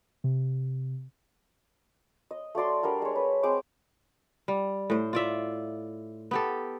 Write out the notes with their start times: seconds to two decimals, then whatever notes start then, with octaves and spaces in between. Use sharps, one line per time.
0.24 C3
2.31 D#5
2.55 A3 F#4 D5 C6
2.83 G3 D4 A#4 F#5
3.02 G#3 C#5
3.16 B4
3.43 G#3 C4 C5 D6
4.48 G3
4.90 A2 C5
5.13 F4 D5 E5
6.31 B3 G4 A4